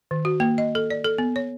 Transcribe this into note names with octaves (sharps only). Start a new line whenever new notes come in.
D#3
F#4
A#3
D#5
A4
D5
A4
B3
C#5